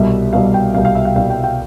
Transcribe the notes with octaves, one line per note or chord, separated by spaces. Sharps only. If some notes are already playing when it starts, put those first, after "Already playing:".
Already playing: C2 B2 G3 E5
C2 B2 G3 F5
G5
C2 B2 G3 F5
F5
E5
F5
C2 B2 G3 F5
G5
G5